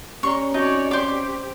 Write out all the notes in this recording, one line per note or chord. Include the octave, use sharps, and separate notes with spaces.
A#3 C#4 G4 D5 A#5 C#6
C4 D#4 F#4 C#5 D5
G4 C5 D5 D6